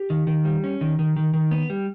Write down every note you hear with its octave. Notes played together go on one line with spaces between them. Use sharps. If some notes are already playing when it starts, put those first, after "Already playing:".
Already playing: G4
D#3
D#3
G3
C#4
D#3
D#3
D#3
D#3
B3
G3